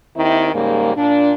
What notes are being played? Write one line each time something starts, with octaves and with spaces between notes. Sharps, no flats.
D#2 D#3 C4 E4
G#2 C#3 G3 A#3
A#2 D4